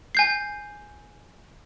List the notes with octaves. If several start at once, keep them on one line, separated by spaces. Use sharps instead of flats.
G#5 G6 C7